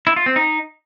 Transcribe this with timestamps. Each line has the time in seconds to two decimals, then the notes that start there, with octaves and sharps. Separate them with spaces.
0.07 E4
0.16 F4
0.26 C4
0.36 D#4